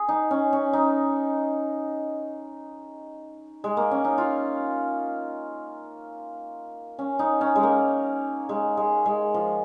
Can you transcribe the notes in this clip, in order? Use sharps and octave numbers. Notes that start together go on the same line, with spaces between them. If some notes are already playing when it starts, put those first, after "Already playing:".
Already playing: G#4
D#4
C#4
C#4
D#4
G#3
A#3
C#4
D#4
F4
C#4
D#4
C#4
G#3
A#3
G#3
G#3
G#3
F3